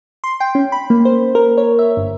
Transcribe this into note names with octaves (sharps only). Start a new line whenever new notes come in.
C6
G5
C#4
B5
A#3
C5
A#4
C#5
E5
G1